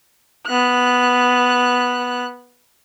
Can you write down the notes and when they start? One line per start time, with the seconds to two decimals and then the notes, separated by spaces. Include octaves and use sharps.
0.46 B3 F#6